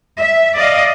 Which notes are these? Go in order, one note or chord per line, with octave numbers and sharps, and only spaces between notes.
E5
D5 D#5 F5